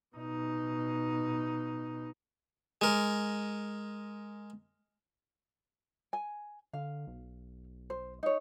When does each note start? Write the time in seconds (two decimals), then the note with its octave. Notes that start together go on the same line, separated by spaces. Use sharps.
0.16 B2 D#4
2.81 G#3 A#4
6.13 G#5
6.73 D3 F5
7.07 B1
7.90 C5
8.23 D#4 C#5